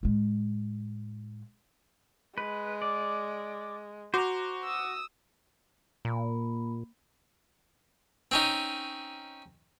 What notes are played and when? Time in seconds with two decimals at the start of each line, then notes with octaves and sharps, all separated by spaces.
0.03 A2 G#3
2.38 G#3 B4
2.82 D5
4.14 F#4 C5 A#5 D6
4.64 D#6 E6
6.05 A#2 A#3 B5
8.31 C4 C#4 D#4